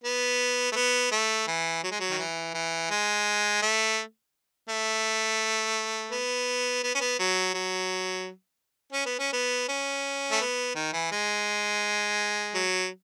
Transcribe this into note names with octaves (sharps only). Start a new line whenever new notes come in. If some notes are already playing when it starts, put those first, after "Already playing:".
B3
A3
B3
A3
E3
F#3
G#3
F#3
D#3
E3
E3
G#3
A3
A3
B3
B3
C#4
B3
F#3
F#3
C#4
B3
C#4
B3
C#4
A3
B3
D#3
E3
G#3
F#3